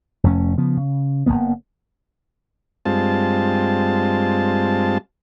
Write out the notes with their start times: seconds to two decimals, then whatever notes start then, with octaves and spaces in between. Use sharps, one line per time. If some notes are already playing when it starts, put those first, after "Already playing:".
0.24 F1 F2 A3 C#4
0.57 C#3 F3 B3
0.77 C#3
1.26 F#1 A#2 A#3 B3
2.85 G2 G#3 C4 F4 A5